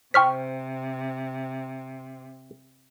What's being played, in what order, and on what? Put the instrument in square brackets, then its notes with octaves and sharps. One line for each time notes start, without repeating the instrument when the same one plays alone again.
[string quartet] C3 [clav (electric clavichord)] C5 G5 [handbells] C#6 F6 B6